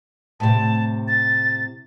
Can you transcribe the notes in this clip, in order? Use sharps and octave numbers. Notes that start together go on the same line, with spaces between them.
A2 C3 A5
A6